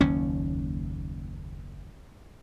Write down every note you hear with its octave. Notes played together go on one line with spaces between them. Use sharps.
F#1 D#2 C#4